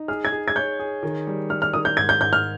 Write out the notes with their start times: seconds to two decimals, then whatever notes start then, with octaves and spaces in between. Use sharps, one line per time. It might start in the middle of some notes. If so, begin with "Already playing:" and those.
Already playing: D#4
0.08 G#4 F6
0.25 G#6
0.32 G#4
0.48 G#6
0.56 C#5 G6
0.79 G#4
1.03 D#3
1.27 G3
1.50 G3 F6
1.62 F6
1.73 D#3 D#6
1.85 G6
1.97 G#2 G#6
2.09 G6
2.20 G#2 G6
2.33 F6